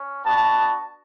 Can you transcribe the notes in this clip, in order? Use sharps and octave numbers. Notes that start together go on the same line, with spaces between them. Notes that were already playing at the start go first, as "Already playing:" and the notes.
Already playing: C#4
B3 D4 F#4 A5